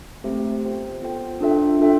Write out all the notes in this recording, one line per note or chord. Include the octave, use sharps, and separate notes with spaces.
A3 C4 G4 C5 E5
B3 F4 A4 C5 G5
B3 F4 A4 C5 G5
D4 F4 A4 E5 G5
D4 F4 A4 E5 G5